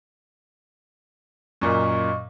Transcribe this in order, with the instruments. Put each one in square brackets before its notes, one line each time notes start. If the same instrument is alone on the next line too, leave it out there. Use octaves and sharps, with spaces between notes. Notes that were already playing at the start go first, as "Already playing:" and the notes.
[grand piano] F#2 A#2 [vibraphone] D#5 C#6